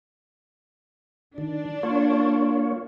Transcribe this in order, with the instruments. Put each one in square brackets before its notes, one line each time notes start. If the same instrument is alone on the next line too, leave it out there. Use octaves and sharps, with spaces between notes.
[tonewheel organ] D#3 [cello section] D4
[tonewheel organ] A#3 F4 C#5